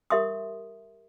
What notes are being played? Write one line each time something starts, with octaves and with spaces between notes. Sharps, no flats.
G4 A#4 E5 C6 D#6